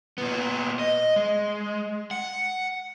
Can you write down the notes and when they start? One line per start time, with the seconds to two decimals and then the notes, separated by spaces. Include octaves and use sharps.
0.18 A#2 B3
0.79 D#5
1.16 G#3
2.11 F#5